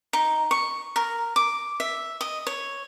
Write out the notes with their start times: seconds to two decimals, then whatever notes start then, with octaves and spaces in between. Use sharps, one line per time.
0.13 D#4
0.51 C#6
0.96 A#4
1.36 D6
1.80 E5
2.21 D#5
2.47 C#5